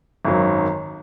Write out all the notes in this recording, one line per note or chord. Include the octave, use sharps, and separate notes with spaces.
G#1 F#2 D#3 F#3